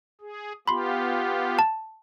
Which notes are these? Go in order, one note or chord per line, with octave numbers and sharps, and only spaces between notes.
G#4
B3 F4 G4 B5 C6
A5